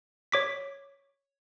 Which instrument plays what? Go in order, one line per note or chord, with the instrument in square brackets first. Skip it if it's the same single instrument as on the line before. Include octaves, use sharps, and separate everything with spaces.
[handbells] C#5 D6 B6